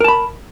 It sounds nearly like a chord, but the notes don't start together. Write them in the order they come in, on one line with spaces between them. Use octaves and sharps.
A#4 A5 B5